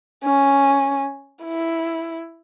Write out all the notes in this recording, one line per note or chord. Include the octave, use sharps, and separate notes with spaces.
C#4
E4